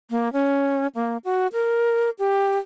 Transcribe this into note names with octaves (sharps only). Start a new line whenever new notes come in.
A#3
C#4
A#3
F#4
A#4
G4